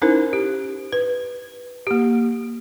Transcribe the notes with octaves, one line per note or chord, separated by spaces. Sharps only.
C#4 D#4 E4 A#4 C5
G4
B4
A#3 G4